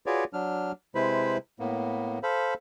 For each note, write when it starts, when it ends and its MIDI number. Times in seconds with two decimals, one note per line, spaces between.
0.06 0.24 65
0.06 0.24 66
0.06 0.24 68
0.06 0.24 71
0.06 0.24 73
0.06 0.24 74
0.33 0.72 54
0.33 0.72 62
0.33 0.72 89
0.95 1.37 48
0.95 1.37 56
0.95 1.37 64
0.95 1.37 71
0.95 1.37 72
0.95 1.37 83
1.60 2.19 45
1.60 2.19 58
1.60 2.19 59
2.23 2.54 69
2.23 2.54 72
2.23 2.54 77
2.23 2.54 83